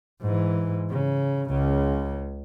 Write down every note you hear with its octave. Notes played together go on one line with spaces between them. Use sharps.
G#2 E3
C#3
C#2 C#3